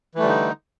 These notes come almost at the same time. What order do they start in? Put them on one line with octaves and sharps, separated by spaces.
E3 A3 G3 D3 D#4